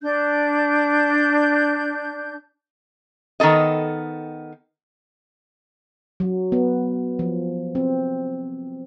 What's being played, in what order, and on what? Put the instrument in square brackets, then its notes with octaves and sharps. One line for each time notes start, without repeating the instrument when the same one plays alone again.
[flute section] D4 G6
[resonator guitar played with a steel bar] D#3 B3 A4 D#5
[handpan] F#3
B3
F3
C4